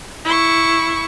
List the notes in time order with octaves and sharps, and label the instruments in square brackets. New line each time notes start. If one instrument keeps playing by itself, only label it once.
[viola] E4 C#6